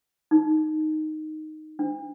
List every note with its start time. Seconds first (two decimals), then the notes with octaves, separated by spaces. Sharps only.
0.31 D#4
1.79 D4